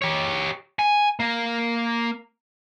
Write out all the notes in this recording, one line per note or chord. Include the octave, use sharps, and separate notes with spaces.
G4 C#5
G#5
A#3